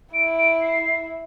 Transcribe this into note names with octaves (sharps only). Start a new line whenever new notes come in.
E4 D7
D7
C7